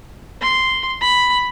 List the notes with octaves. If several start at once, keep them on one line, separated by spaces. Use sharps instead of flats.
C6
B5